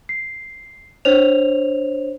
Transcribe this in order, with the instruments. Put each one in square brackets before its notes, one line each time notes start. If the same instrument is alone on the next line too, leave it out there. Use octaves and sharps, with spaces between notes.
[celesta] C7
D4 C5 C#5 F7